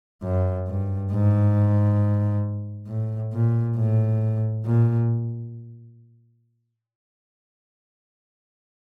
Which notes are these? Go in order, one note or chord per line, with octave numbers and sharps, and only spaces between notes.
F#2
G2
G#2
A2
A#2
A2
A#2